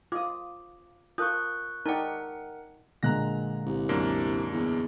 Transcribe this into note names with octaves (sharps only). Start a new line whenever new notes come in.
F4 F5 D6 D#6
F4 A#4 A5 C#6 D#6 F#6 G6
D#4 A#4 D5 F#5 G5 A5
A#2 D3 G#3 A#5 F#6 A#6
C2
F#2 A#3 D4
E2